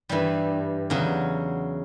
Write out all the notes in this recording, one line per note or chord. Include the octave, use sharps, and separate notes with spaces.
G2 E3 G3
E2 C#3 F#3